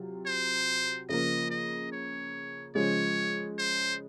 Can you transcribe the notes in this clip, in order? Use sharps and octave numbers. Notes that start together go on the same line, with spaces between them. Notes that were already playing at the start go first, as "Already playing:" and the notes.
Already playing: C3 F#3 F4
C5
C#3 F3 A#3 D#5
D#5
C#5
C#3 F3 G#3 C#4 C#5
C5